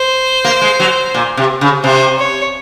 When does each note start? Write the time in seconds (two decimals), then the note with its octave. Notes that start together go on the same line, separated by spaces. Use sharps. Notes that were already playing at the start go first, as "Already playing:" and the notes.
Already playing: C5
0.45 A#3
0.61 G#3
0.80 F#3
1.14 A#2
1.37 C3
1.61 C#3
1.84 C3 C5
2.19 C#5